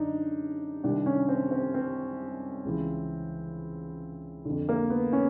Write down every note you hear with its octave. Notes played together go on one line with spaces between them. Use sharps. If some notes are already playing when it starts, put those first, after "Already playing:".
Already playing: F#2 D3 D4 D#4
C2 C3 D#3 D4
C#4
C4
C4
C4
C#2 C#3 E3
F2 D3
A#3
B3
C#4